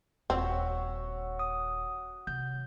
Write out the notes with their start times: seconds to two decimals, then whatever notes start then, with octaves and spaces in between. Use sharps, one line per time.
0.30 D#1 C4 F#4 C#5 E5
1.39 D#6
2.27 C3 G6